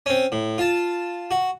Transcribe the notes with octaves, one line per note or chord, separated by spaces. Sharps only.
C4 C#4
A2
F4 A5
F#4